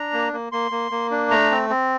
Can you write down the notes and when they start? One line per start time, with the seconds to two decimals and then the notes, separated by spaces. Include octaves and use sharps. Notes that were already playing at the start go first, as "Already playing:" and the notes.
Already playing: D4 A#5
0.13 A#3
0.33 A#3
0.52 A#3 C6
0.71 A#3
0.92 A#3
1.11 D4
1.31 A3 A#5
1.51 C4
1.70 C4